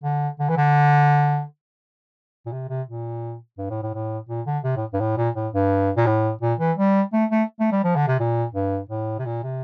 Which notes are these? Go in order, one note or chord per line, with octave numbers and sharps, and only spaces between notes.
D3
D3
E3
D3
A#2
C3
C3
A#2
G2
A2
A2
A2
A#2
D3
C3
A2
G2
A2
A#2
A2
G2
A#2
A2
A#2
E3
G3
A3
A3
A3
G3
F3
D3
C3
A#2
G2
A2
C3
A#2
C3